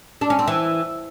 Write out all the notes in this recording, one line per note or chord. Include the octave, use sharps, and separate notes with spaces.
D4
C#4
C4
E3